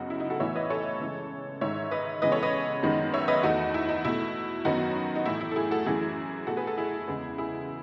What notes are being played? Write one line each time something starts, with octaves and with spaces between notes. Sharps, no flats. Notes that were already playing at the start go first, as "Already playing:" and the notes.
Already playing: F#2 C#3 F#3 B3 D#4 F#4
E4
D#4
F#4 A4
A2 E3 B3 C#5 E5
B4 D#5
A4 C#5
C#3 E3 G#3
G#2 D#3 G#3 C#5 E5
B4 D#5
C#3 E3 G#3 B3 B4 D#5
A4 C#5
B4 D#5
F#2 D#3 G#3 B3
C#5 E5
B4 D#5
E2 D#3 A3 D#4 F#4
E4
D#4
B2 A3 E4
F#2 D#3 F#3 B3 D#4 F#4
D#4
A2 E3 A3 E4
E4
A4
E4 G#4
F#4 A4
F#2 E3 A3 E4 G#4
B2 A3 F#4 A4
G#4 B4
F#4 A4
E4 G#4
E2 C#3 G#3 B3
E4 G#4